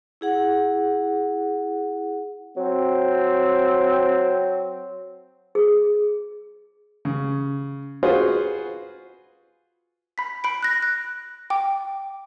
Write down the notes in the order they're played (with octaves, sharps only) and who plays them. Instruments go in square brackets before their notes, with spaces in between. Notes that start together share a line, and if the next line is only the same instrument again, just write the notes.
[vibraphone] E4 G#4 F#5
[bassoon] F#3 [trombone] C4
[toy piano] G#4
[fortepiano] C#3
F4 F#4 G#4 B4 C5
[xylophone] B5 B6
B5 D7
F#6 A#6
F#6
G5 D6